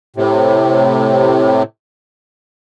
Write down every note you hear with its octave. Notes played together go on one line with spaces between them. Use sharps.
A2 C3